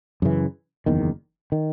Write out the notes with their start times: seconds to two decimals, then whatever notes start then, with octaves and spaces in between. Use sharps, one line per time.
0.22 F#2 C#3 E3
0.86 F#1 E2 D#3
1.52 D#3